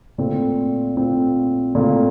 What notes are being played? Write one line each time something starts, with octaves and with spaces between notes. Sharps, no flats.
A#2 A3 C4 F4
A#2 A3 C4 F4
A#2 A3 C4 F4